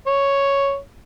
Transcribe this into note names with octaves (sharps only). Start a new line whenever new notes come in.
C#5